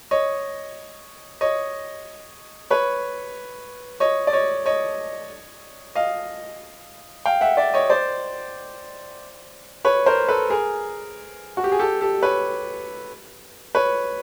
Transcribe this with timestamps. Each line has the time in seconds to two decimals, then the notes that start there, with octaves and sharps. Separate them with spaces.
0.11 C#5 D#5
1.41 C#5 D#5
2.70 B4 C#5
4.00 C#5 D#5
4.27 D5
4.33 C#5 D#5
4.66 C#5 D#5
5.95 D#5 F5
7.25 F5 G5
7.41 E5 F#5
7.57 D5 E5
7.74 C#5 D#5
7.90 C5 D5
9.85 B4 C#5
10.06 A#4 C5
10.28 A4 B4
10.50 G#4 A#4
11.57 F#4
11.64 G4
11.72 G#4
11.79 G4 A4
12.01 G4 A4
12.23 B4 C#5
13.75 B4 C#5